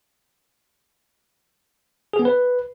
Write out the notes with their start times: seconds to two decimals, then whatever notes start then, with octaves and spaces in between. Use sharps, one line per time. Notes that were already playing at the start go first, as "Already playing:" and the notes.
2.13 G#4
2.19 B3
2.25 B4